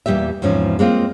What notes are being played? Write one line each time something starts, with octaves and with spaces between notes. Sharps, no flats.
E2 A#2 C#3 G3 G4 E5
E2 G#2 C3 F3 C#4
G#3 A#3 C4 F4